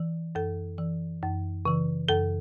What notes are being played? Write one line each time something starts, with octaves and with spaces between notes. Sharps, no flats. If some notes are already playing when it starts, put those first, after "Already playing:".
Already playing: E3
F#2 A4
E3
F#2
C#3 E3
F#2 A4